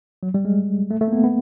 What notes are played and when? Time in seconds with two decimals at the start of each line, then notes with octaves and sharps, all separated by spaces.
0.23 F#3
0.34 G3
0.45 G#3
0.91 A3
1.01 A3
1.08 A#3
1.13 B3
1.24 B3